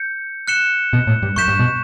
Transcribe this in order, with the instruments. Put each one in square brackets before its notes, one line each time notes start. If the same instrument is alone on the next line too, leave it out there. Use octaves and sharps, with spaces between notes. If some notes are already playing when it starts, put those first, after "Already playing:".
Already playing: [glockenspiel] G6 C#7
F#6 C#7 E7 G7
[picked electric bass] B2
A2
G2
[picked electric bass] F#2 [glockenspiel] C#6 G6 B6 E7
[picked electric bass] G2
B2